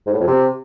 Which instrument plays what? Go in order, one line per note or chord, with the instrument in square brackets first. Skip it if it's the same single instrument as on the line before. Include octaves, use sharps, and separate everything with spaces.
[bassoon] G#2
A2
F2
C3